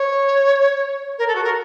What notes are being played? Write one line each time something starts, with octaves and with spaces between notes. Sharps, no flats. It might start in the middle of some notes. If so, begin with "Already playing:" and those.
Already playing: C#5
A#4
A4
F#4
A#4